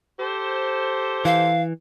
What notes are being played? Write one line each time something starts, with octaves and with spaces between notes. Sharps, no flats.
G4 A4 C5
E3 F5